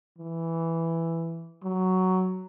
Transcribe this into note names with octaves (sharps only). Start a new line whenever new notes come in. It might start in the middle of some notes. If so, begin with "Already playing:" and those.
E3
F#3